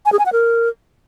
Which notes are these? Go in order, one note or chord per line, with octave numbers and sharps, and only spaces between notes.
G#5
G#4
G#5
F#5
A#4